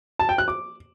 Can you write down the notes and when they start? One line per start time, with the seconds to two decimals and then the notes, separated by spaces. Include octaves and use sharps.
0.19 A5
0.29 G5
0.38 F#6
0.48 D6